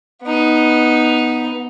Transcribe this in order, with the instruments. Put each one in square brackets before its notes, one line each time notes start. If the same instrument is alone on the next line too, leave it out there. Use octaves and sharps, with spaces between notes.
[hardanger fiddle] B3 D#4